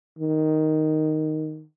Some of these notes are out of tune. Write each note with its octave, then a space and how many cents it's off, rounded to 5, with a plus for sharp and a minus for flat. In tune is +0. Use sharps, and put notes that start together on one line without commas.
D#3 +0